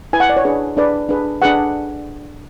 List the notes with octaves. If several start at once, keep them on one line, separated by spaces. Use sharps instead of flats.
E4 B4 G#5
F#5
D5
C#5
D4 G#4 B4
D4 G#4 B4 D5
D4 G#4 B4
D4 G#4 B4 F#5